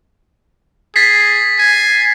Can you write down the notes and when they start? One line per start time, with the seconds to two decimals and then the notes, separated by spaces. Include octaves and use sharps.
0.96 G#4 A6 B6 C7
1.59 G#5